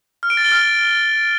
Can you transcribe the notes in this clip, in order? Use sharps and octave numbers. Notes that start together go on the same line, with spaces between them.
F6
D7
A6
G7
F6